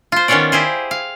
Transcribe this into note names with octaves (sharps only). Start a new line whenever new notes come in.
F4 C5
D#3 B3 C#4 F4 C#5 D5
E4 G4 G#4 C5
F5